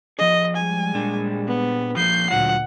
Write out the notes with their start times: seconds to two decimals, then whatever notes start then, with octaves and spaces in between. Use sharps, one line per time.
0.19 F3 G#4 D#5
0.56 G3 G#3 G#5
0.94 A#2 D4
1.47 B3
1.97 F3 A#3 G6 C7
2.30 D2 A#2 D3 F#3 F4 F#5